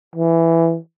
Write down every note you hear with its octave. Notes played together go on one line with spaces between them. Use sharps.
E3